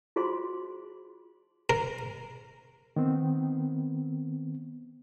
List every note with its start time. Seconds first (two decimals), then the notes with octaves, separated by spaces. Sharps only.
0.16 F4 F#4 G#4 C5 C6
1.70 A#4
2.96 D#3 B3 C4